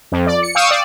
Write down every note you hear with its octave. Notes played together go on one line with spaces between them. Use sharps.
F2
D5
C#7
F5 G5 C#6 D#6 E6
D5